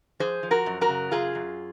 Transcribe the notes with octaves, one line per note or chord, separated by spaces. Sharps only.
F3 G#4 C5
F3
F#4 A#4
F#2
F#4 A#4
C#3
F#2 F4 G#4
F#2